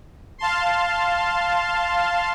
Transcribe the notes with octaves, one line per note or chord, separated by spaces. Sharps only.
F5 A5 C6